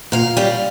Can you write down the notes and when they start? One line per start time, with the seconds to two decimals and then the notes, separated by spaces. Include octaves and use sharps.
0.12 A#2 F5
0.37 G3 C#4